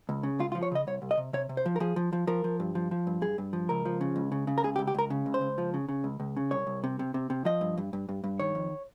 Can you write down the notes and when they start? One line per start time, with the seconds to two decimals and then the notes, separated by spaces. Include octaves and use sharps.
0.09 C#2
0.23 C#3
0.39 C#2 F4
0.52 F4
0.55 F3
0.63 C#5
0.72 C#3 D#5
0.87 C2 C#5
1.02 C2
1.11 D#5
1.18 C3
1.33 C3 C#5
1.49 C3
1.57 C5
1.66 F3
1.76 A#4
1.80 F3 G#4
1.96 F3
2.13 F3
2.27 F3 A#4
2.44 F3
2.60 G2
2.75 F3
2.91 F3
3.07 G2
3.22 G2 G#4
3.38 G2
3.53 F3
3.69 C#2 A#4
3.85 F3
4.01 C#3
4.16 C#2
4.32 C#3
4.47 C#3
4.58 A#4
4.64 C#2 G#4
4.76 G4
4.79 C#2
4.87 G4
4.94 C#2 A#4
5.10 C#3
5.26 C#2
5.34 C5
5.41 C#2
5.58 F3
5.74 C#3
5.89 C#3
6.04 C#2
6.20 C#2
6.37 C#3
6.51 C2 C#5
6.67 C2
6.84 C3
6.99 C3
7.14 C3
7.30 C3
7.45 F3 D#5
7.61 G2
7.78 G2
7.93 G2
8.09 G2
8.24 G2
8.40 D#3 C#5
8.55 F2